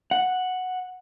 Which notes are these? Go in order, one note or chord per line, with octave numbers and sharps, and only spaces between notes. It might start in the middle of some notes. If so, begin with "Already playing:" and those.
F#5